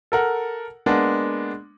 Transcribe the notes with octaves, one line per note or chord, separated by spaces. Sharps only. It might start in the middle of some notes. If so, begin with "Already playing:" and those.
A4 A#4 F#5
G#3 A#3 B3 D4